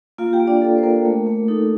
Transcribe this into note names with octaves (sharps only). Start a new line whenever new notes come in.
A#3 F4 F5
G4 G5
A#3
D4 D5
A#3 A4
C5
A#3 A#4
A3
A3
D#4 A4